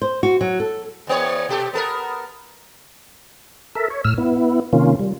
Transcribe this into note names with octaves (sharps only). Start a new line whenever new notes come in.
C5
F#4
F#3
A4
E2 A#3 C#5
B2 G4 A4
B3 A4 A#4
A4 A#4 E5
C#5
A2 E6 F6
B3 E4
C3 D#3 A#3 C#4 F4
G3